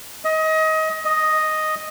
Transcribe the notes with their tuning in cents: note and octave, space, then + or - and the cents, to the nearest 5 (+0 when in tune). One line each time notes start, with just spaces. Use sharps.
D#5 +25
D#5 +0